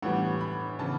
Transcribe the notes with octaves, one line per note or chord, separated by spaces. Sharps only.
A2 E3 G3 B3 F#5
B5
C#3 E3 B3 A5